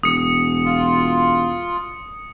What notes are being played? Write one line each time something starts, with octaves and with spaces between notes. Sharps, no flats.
E1 D#6 C#7
F4